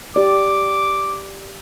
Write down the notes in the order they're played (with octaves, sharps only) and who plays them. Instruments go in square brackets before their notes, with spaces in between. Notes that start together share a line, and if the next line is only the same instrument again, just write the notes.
[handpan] G4 D5 [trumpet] D6